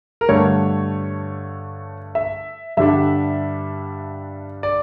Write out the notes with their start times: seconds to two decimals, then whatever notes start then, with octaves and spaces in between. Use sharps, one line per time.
0.21 A#4
0.29 G2 D3 A3 C#5
2.15 E5
2.77 G2 D3 G3 D4 E5
4.63 D5